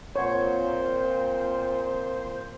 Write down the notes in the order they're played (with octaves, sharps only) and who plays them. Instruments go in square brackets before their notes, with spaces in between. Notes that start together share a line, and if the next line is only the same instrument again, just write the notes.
[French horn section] A#2 C4 [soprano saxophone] C5 [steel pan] C#5 F#5